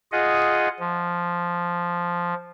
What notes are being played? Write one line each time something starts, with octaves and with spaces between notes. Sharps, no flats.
F4 G#4 D#5 F#5
F3